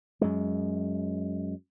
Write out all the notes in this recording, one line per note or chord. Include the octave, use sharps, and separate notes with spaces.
F#2 G#3